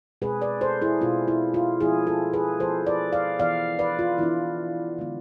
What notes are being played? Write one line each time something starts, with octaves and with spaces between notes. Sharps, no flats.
B2 G#3 C4 G#4 B4
B4 D5
A4 C5
E4 G#4
B2 G#3 C4 F4
E4
F4
F3 B3 E4 G#4
F4 A4
G#4 B4
F3 B3 E4 A4 C5
B4 D5
D5 F5
E3 B3 D4 D5 F5
B4 D5
F4
E3 B3 D4 E4
D3 G#3 B3